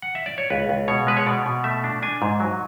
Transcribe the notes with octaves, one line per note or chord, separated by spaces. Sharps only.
F#5
E5
D5
C#5
C#2 B4
C#2
B2 C#5
G#3 B4
C#5
B2 D5
B2
A3 E5
D4
D4 G#5
G#2
F#3